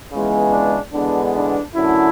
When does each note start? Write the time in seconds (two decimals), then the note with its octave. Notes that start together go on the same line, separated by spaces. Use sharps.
0.12 C#2 C#3 E3 G#3 B3
0.52 D4
0.93 E2 D3 G#3 B3 D4
1.34 D4
1.75 F#2 D3 A3 E4